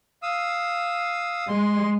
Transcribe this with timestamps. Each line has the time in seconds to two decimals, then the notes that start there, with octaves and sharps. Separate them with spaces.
0.23 F5 D#6 E6
1.49 G#3 C6